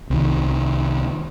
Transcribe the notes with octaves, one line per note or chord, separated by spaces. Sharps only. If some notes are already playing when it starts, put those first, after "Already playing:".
C2 D#3